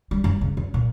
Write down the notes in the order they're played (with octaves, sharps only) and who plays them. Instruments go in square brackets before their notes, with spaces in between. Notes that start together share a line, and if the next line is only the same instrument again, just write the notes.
[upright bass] G3
F#2
C#3
F#2
A#2